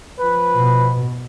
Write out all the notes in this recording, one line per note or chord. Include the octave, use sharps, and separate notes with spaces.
F3 B4
B2